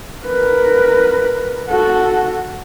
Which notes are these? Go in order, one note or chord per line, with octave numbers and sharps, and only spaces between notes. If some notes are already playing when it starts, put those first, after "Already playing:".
A#4 B4
F#4 A4